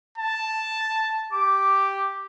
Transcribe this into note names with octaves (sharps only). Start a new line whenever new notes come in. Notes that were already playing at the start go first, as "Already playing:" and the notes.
A5
G4 D6